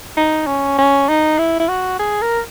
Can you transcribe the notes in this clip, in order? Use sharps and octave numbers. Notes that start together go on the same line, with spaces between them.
D#4
C#4
C#4
D#4
E4
E4
F#4
G#4
A#4